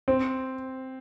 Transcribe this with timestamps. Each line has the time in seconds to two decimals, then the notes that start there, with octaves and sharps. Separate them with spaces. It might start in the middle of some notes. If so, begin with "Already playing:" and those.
0.08 C4